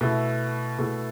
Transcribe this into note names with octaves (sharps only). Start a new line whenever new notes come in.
B2 A3 E4
B2 A3 E4